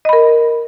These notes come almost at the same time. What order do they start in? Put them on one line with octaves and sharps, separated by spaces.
D#5 B5 A#4